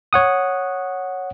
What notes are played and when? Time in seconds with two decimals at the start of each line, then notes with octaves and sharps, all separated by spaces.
0.13 C#5 F#5 D#6